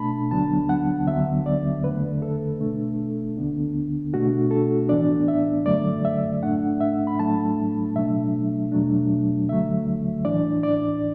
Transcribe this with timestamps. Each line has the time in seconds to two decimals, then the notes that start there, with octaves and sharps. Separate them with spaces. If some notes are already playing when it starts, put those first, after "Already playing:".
Already playing: B2 A3 D4 A5 B5
0.31 D2 D3 F#3 B3 D4 A5
0.69 F#5
1.07 D2 D3 F#3 B3 E5
1.46 D5
1.84 E2 D3 A3 B4
2.22 A4
2.60 B2 A3 D4
3.37 D2 D3 B3 D4
4.13 B2 A3 D4 F#4
4.51 A4
4.89 A2 E3 B3 D4 D5
5.28 E5
5.66 F#2 D3 F#3 A3 D5
6.05 E5
6.43 A2 A3 D4 F#5
6.80 E5
7.07 B5
7.19 A2 F#3 A3 D4 A5
7.96 B2 F#3 A3 D4 E5
8.72 E2 B2 F#3 A3 D4
9.48 D2 D3 F#3 A3 E5
10.25 A2 E3 D4 D5
10.63 D5